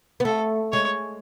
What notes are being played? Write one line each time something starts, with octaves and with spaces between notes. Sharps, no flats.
B3
A3 A4
G#3 C#5